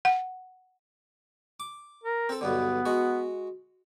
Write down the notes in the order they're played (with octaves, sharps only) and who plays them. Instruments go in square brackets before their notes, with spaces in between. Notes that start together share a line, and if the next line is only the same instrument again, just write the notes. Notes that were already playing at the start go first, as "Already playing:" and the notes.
[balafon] F#5
[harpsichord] D6
[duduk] A#4
[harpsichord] C4 A4
[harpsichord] B1 G2 D3 [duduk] B3
[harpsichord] G#3 F#4